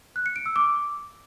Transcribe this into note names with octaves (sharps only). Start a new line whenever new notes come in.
F#6
C#7
D7
E6
D6